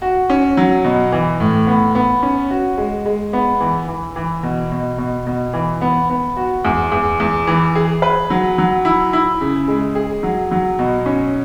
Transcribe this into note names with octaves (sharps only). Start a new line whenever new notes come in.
F#4
C#4
F#3
B2
E3
A2
B3
B3
C#4
F#4
G#3
G#3
B3
E3
E3
E3
B2
B2
B2
B2
E3
B3
B3
F#4
E2
E2
E2
E3
G#4
B4
F#3
F#3
E4
E4
C#3
G#3
G#4
F#3
F#3
B2
C#4